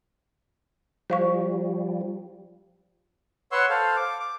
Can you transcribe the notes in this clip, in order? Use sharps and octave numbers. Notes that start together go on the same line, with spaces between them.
F3 G3 C5 F5 C#6
B4 C#5 F#5 C6 C#6 E6
A4 C5 F5
D6
D6